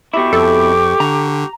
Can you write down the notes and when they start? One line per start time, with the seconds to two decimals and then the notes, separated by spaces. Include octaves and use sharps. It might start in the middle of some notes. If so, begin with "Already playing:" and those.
0.14 B2 E4 G4 C#6 D6
0.33 F2 A4
1.00 D3 A#5